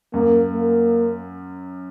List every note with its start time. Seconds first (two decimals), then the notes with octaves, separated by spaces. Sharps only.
0.13 F#2 A#3
0.52 A#3